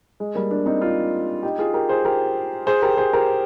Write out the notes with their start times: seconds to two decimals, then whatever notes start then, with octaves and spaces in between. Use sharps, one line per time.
0.20 G#3
0.35 G3 A#3
0.51 A#3 D4
0.66 C4 D#4
0.81 D4 F4
1.43 D#4 G4
1.59 F4 G#4
1.74 G4 A#4
1.89 G#4 C5
2.05 G4 A#4
2.67 G#4 C5
2.82 G4 A#4
2.97 G#4 C5
3.13 G4 A#4